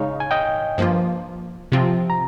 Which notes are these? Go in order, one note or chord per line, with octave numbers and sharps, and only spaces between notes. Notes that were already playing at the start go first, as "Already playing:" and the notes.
Already playing: C#3 G#3 D#4 C#5 F5
G#5
D#5 G5
G2 F3 A#3 F4
C3 F3 C4 F4
A#5